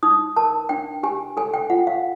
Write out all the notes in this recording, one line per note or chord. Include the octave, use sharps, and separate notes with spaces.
D#4 D#6
A#4 A5
D4 G5
G4 G#5
A4 G#5
G5
F4 F#5
F5